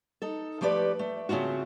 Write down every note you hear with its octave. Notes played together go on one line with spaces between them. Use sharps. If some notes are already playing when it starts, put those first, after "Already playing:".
D#4 A4
F3 A3 G4 B4 C5 D5
A3
C#3 A3 C4 F4 F#4